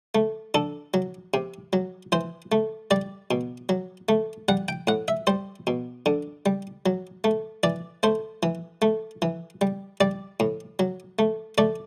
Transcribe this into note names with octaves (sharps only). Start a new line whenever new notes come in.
A3
D3 A4
F#3
C3
F#3
E3 C5
A3
G3 D5
B2
F#3
A3
G3 F#5
G5
A2 F#5
E5
G3 C5
B2
D3
G3
F#3
A3
E3 D5
A3 C5
E3
A3
E3
G3
G3 D5
A2
F#3
A3
A3 D5